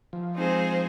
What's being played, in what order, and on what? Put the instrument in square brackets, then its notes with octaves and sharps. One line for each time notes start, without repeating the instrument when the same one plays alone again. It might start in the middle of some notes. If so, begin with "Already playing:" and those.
[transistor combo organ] F3
[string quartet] G#3 C4 D#4 G#4 C5